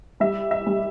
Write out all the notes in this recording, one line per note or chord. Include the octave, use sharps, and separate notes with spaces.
G3 E5
E5
G3